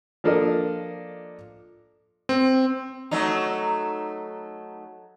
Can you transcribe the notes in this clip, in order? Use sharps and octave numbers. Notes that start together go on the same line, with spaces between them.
F3 A#3 D4 A4 A#4 D#5
C4
F#3 A3 D#4